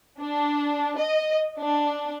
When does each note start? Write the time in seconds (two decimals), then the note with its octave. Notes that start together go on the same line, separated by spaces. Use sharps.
0.20 D4
0.97 D#5
1.58 D4